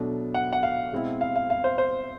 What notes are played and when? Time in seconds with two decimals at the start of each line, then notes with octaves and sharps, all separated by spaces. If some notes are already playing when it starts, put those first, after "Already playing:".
Already playing: B2 F#3 A3 D4
0.34 F#5
0.53 F#5
0.63 F5
0.92 B2 G#3 C4 E4
1.21 F5
1.36 F5
1.50 F5
1.64 C5
1.78 C5